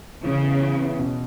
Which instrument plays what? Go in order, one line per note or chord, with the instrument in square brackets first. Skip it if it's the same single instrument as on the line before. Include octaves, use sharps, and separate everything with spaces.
[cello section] C#3 [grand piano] E3
[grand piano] B3 E4
E3
B3 E4
B2